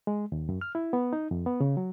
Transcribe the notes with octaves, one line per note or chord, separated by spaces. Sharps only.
G#3
D#2
F#2
F6
E4
B3
D#4
F2
B3
C#3
F#3